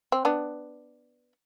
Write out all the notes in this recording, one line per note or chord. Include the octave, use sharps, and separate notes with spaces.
C4
B3 D4